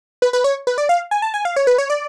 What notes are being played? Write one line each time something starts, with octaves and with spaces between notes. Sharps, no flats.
B4
B4
C#5
B4
D5
F5
G#5
A5
G#5
F5
C#5
B4
C#5
D5